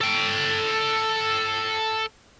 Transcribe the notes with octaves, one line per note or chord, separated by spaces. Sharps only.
A4 G5